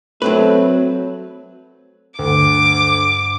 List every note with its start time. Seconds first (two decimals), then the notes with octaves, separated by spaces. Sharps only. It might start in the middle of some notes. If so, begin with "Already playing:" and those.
0.22 F#3 A3 C4 B4
2.19 D2 G2 D6